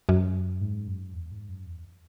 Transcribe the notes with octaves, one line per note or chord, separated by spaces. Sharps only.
F#2
G#2
F#2
E2
G#2
F#2
E2